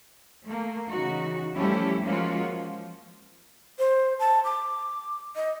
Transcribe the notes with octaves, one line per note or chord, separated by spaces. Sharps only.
A3 A#3
C#3 E3 D#4 F#4
F3 G3 A3 C#4 E4 G4
F3 G#3 A#3 C#4 F4 F#4
F3
C5
A5
D6
D#5